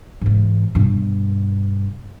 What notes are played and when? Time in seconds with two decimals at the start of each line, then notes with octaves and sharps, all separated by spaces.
0.21 G#2 E3
0.75 G2 B2